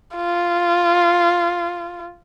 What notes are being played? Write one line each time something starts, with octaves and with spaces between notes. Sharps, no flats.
F4